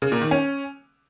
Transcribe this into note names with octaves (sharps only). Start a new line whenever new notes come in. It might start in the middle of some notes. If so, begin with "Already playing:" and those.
C#3
A#2
D#3
C#4